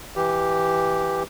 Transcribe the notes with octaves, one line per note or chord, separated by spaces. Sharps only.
E3 G4